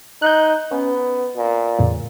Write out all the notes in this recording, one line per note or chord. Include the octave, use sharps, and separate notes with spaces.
D#4 F#6 G6
B3 C#4
A#2
E2 A2 C#3